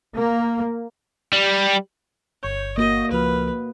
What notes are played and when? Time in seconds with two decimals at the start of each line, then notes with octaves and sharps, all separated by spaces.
0.15 A#3
1.33 G3
2.43 G1 C#5 C#6 G6
2.78 A#3 F#4 D#5
3.11 C#2 F3 B4 F6